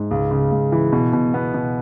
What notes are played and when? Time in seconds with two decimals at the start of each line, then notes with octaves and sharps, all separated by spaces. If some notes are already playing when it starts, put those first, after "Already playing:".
Already playing: G#2
0.11 C#2
0.31 C#3
0.52 C#2
0.72 E3
0.92 B2
1.13 B2
1.34 B3
1.54 B2